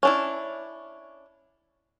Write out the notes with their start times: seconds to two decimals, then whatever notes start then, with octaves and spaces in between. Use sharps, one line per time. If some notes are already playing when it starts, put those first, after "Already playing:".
0.03 C#4 D4 E4